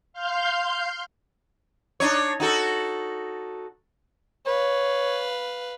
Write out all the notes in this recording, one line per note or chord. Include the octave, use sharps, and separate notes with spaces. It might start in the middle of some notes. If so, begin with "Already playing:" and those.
F5 C6 F6 G6
D4 D#4 C#5
D#4 F#4 A4
B4 C#5 F5